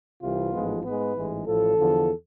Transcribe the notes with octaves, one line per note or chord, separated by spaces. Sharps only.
C2 C3 E3 F4
A1 G#2 F3 G#3 B3
G#2 G#3 B3 B4
A1 G#2 E3 G#3
A1 A2 F3 A4
E2 D3 F3